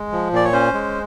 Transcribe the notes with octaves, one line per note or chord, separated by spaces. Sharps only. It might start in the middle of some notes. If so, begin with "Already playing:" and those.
Already playing: G#3
F3
A#2 D5
C#5
C#4 C5
G#3